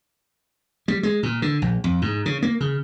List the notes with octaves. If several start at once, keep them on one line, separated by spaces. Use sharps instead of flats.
G3
G#3
A#2
D3
A#1
F2
G#2
C#3
A#3
C#3